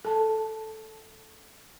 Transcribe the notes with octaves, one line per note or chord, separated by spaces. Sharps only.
A4 A5